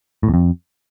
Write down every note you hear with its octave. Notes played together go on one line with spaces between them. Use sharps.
A2
E2
F2